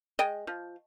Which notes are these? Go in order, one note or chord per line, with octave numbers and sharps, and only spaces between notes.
G#3 D#5 G5
F3